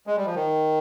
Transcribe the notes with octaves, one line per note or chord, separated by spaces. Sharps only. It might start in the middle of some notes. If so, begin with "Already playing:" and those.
G#3
G3
F3
D#3